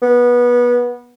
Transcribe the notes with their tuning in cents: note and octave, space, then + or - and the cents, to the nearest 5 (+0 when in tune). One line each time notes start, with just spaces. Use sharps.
B3 -20